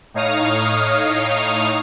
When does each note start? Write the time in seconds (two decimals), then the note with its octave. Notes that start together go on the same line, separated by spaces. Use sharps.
0.14 A2 D#4 C#5 F5 D#6 F6